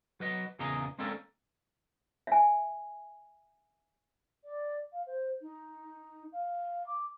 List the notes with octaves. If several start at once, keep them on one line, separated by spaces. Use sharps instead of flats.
F#3 B4 D#5
E2 A#2 C#3 G#4 D#5 A#5
G#3 A#3 C4 C#4 A4 D5
E5 G#5
D5
F5
C5
D#4
F5
D6